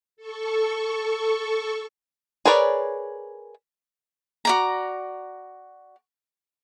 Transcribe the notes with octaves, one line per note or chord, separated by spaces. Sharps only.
A4 C#6
G#4 A#4 B4 C#5 D5
F#4 D5 A#5